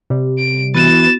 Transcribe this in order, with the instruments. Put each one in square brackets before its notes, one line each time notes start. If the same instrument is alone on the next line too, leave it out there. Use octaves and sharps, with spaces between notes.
[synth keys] C3 G3
[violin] D7
[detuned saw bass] E3 [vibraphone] B3 E4 F#4 [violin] A6 E7